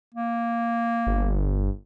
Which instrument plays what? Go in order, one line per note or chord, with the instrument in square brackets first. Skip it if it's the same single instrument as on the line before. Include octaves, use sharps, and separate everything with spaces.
[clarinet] A#3
[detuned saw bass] G1